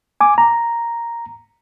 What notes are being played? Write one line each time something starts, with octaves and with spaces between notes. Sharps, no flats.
G#5 D6
A#5